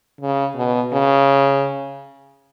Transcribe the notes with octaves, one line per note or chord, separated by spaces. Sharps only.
C#3
B2
C#3